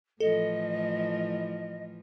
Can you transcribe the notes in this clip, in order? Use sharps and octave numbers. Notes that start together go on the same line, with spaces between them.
A2 E3 F3 A4 D#5